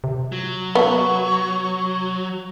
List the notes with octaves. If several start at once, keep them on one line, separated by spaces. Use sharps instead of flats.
C3
F#3
B3 C#6